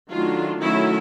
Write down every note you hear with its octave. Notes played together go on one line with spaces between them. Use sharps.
D#3 F#3 A3 D4 F4
D#3 F#3 A3 C#4 E4